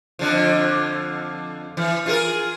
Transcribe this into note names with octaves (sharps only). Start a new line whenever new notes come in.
F2 D3 F3
E3
F4 G#4 A#4